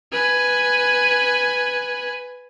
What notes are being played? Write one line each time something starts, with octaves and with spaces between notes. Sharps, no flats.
B4 G#5